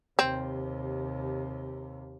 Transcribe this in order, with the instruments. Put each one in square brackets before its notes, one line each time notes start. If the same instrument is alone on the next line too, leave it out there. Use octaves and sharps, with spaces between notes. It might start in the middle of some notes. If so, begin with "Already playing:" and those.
[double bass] D#2 C3 [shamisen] C4